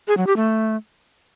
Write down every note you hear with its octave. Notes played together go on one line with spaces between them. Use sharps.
G#4
F#3
G4
A3